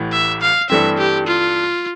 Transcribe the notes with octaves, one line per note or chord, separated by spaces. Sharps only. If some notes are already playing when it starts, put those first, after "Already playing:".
Already playing: A1 A2 E3
E5
F5
G2 E3 A3 C4 E5
G4
F4